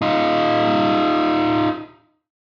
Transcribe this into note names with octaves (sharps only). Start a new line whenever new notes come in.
D#4 F4